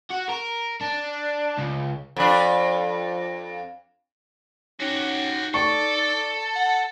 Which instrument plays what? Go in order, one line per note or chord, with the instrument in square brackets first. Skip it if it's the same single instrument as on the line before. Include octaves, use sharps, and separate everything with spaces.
[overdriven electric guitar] F#4
A#4
D4
C#2
[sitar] F2 D4
[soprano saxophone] C#4 [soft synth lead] D#4 [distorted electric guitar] F#4 G4
[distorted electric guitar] A4 [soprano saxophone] D5 [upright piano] C#6
[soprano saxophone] F#5